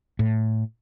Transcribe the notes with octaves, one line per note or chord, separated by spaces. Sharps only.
A2